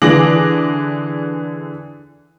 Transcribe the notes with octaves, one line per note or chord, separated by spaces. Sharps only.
D3 E3 G#4 D6 A#6 F#7